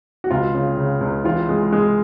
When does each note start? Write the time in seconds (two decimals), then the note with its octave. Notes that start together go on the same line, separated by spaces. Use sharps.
0.24 F#4
0.31 C#2 F4
0.54 C#3
0.77 C#3
1.01 C#2
1.24 E3 F4
1.49 G#3
1.72 G#3